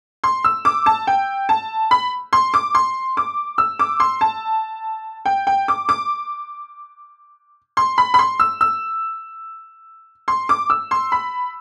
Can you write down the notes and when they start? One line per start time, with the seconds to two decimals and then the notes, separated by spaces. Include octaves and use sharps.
0.24 C6
0.44 E6
0.65 D6
0.86 A5
1.07 G5
1.49 A5
1.91 B5
2.33 C6
2.54 D6
2.75 C6
3.17 D6
3.58 E6
3.79 D6
4.00 C6
4.21 A5
5.25 G5
5.47 G5
5.68 D6
5.89 D6
7.77 C6
7.98 B5
8.14 B5
8.19 C6
8.40 E6
8.61 E6
10.28 C6
10.49 D6
10.70 E6
10.91 C6
11.12 B5